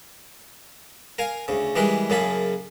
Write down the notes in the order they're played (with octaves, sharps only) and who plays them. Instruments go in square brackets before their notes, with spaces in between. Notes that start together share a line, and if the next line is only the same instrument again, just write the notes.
[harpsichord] A#4 F5 G#5
D2 C#3
E3 G3 G#3 G#4 A#4 B4
F#2 C#3 A#3 G#4 A4 B5